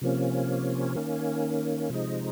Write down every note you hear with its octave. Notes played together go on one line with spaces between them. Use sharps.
C3 F3 A#3 C#4
D#3 A#3 C#4
C3 F3 G#3 D#4